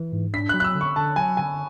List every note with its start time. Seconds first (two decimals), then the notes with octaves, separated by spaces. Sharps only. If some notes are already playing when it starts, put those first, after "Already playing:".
Already playing: E3
0.12 G#2
0.34 D4 B6
0.49 F#6
0.54 F#3
0.60 F#6
0.64 E6
0.75 D3
0.81 C#6
0.96 D3 A5
1.16 F#3 G#5
1.37 D3 G#5